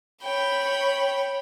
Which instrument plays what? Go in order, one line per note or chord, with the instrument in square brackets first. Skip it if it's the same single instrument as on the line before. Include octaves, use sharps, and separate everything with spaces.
[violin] C#5 B5 [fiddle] G5